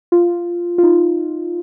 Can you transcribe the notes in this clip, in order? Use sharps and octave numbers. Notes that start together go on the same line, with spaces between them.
F4
F4
D#4